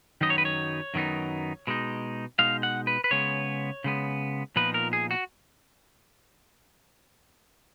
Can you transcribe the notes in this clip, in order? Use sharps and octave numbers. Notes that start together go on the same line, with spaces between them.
F#2 D#3 F#3 B3 D#4 D#5
C#5
B4
C#5
F#2 D#3 F#3 B3 D#4
B2 G#3 D#4
B2 G#3 D#4 F5
F#5
B4
B4
C#3 G#3 B3 C#5
C#3 G#3 B3
A#2 F3 B3 D#4 B4
A#4
G#4
F#4